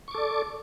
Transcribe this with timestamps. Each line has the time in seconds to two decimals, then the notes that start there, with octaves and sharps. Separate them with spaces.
0.08 C#6
0.11 D6
0.14 A4
0.18 D5